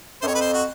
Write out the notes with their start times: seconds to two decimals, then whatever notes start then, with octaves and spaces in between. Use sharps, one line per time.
0.22 F#2 C5
0.27 F2 C#5
0.35 B4
0.41 C5
0.54 F#4